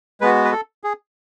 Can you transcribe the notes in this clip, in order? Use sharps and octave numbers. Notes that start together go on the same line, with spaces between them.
G#3 B3 F#4 B4
B4
A4
G#4